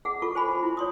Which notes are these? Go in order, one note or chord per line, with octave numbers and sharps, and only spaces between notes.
G#4 F#5
F4 A4 C#6
C5 G#5 B5
F4
E4 C6
C#5 C6 D#6